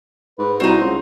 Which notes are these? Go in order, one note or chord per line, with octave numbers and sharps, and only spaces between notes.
G#2 B4
C2 C4 D#4 F#4
C#2 C5